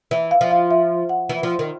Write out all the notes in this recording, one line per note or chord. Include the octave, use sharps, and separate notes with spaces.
E3 E5
F5
F3 E5
F5
E5
F#5
E3
F3
D#3